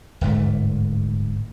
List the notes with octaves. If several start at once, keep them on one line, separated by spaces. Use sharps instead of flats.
D1 G1 G#2 A3